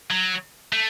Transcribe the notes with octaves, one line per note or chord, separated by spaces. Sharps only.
F#3
A3